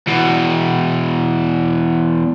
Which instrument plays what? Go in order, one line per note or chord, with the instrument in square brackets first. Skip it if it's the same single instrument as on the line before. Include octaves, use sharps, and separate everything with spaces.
[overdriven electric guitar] E2 B2